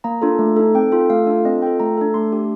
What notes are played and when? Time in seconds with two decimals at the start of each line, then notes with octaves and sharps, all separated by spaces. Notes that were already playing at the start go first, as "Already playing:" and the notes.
0.04 A#3 A#5
0.22 D4 F4 A4
0.39 A3
0.56 D#4 A4
0.75 C4 G5
0.92 F4 A4
1.10 A3 F5
1.27 D4 F4 A4
1.45 C4 D#5
1.62 F4 A4 G5
1.80 A3 A#5
1.97 D4 A4
2.14 A3 C6
2.32 D4 G4